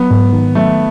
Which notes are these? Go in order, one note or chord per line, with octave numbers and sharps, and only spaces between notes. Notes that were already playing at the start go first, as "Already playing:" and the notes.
Already playing: F#3 B3
G#2
D#3
F#3 A3